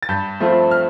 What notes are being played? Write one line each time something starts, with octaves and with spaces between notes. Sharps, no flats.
A6
G2 G6
F3 A3 C4 F4
F6